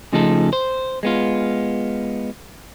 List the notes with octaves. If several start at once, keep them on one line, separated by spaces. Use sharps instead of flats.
C#3 F3 A3 D#4 G#4 A4
C5
G#3 B3 F4